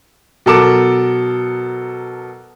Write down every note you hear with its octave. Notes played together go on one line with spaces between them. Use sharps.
B2 F#3 A4 A#4 D6 E7